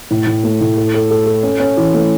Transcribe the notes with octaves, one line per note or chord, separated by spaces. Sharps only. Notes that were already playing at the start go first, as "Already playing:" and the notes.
A2
A2
A3
A2
A4
A4
A4
A4
C#4
C#4
E3
A3